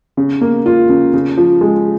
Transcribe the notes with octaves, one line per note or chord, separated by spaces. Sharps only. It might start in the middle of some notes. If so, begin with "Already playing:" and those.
C#3
A#3
F4
C#3
C#3
F3
G#3